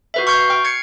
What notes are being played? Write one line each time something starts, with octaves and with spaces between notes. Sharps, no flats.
F#4 B4 E5
C#6 F6 G6 C7
G5 F6
G#6 C7 C#7